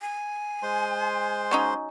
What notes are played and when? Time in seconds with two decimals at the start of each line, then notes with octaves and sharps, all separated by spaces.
0.02 G#5
0.63 G#3 C5 C6
1.51 F#3 C#4 D#4